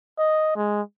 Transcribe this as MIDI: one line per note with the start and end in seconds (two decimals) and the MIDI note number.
0.18 0.52 75
0.56 0.81 56